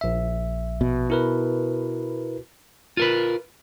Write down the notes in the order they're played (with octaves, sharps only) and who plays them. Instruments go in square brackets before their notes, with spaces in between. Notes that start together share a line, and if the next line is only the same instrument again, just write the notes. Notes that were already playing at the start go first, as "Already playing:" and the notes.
[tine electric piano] A#1 E5
[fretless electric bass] B2
[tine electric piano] E4 A#4 B4
[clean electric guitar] F4 A#4 B4